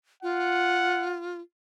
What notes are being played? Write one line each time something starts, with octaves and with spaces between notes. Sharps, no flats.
F4 F#5